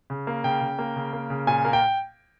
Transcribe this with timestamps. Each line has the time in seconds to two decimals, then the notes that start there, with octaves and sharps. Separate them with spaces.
0.10 C#3
0.27 A#3
0.44 C#3 G5
0.61 C#3
0.78 A#3
0.96 C#3
1.13 A#3
1.30 C#3
1.47 A#2 G#5
1.65 A#3
1.73 G5